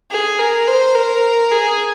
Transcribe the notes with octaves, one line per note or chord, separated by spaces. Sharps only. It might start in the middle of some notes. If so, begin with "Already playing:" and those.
G#4
A#4
C5
A#4
G#4